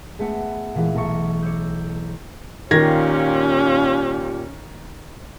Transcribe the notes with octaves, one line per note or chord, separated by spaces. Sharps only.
G#3 A3 B3 F#4
A#2 E3 G#3
B1 A4 C#6
C#5 D6 E6 G6
A#2 D#3 C#4 F4 G4 G#6 A#6